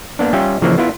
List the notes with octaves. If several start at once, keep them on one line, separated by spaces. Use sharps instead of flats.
A#3 B3 D4
G3 C#4 F4 E5 G5
C#3 E3 F3 A#3 D4
B3 E4 F4